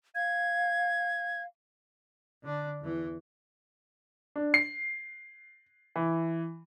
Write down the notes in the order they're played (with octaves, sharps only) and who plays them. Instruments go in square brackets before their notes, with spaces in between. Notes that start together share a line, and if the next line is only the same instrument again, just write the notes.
[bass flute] F5 [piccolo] G#6
[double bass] D3 D4
E2 E3
[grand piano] D4
C7
E3